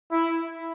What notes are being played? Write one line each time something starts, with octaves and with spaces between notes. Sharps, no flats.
E4